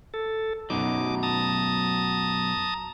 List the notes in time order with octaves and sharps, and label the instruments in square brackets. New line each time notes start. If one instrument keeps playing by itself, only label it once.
[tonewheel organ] A4
[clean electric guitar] F#2 B2 F#3 [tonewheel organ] D#4 D6
[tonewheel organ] A5 A#5 D#6